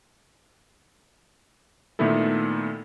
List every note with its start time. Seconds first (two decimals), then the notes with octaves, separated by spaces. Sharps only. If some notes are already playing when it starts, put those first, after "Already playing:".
1.99 A#2 D#3 A3 B3 E4 A4